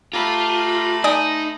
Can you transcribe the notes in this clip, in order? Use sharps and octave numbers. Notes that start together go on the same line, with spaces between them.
A3 F4 G4 A4 A#5 B5
D#4 D5 G#5 D#6